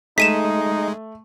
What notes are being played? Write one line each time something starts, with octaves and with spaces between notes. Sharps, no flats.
G#3 A3 D#4 B6 D#7 E7